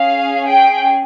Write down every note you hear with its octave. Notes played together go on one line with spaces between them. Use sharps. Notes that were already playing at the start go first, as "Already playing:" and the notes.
Already playing: C#4 G#4 F5
G5